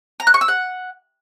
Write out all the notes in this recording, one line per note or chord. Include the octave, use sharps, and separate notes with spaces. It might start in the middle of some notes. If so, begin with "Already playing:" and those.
A#5
F#6
C#6
E6
F#5